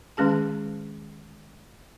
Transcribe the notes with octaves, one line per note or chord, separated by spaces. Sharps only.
D#3 G#3 C#4 G#4 A5